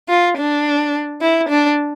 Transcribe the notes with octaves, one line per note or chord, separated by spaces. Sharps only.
F4
D4
E4
D4